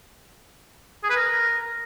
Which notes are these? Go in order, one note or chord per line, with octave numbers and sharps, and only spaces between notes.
G#4
B4
A#4